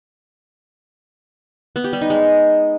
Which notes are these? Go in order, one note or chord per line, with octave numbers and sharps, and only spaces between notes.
B3
G4
G3
D#4
G#3